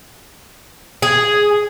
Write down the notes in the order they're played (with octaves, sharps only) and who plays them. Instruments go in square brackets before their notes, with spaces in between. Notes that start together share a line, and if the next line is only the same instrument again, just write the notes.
[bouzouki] G#4